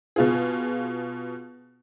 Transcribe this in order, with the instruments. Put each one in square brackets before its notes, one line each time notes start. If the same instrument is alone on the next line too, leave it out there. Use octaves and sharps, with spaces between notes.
[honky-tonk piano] B2 F4 G#4